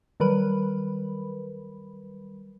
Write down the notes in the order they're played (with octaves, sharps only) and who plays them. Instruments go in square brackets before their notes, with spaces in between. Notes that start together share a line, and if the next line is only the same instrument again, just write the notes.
[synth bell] D#3 F#3 G3 A#4 B4 B5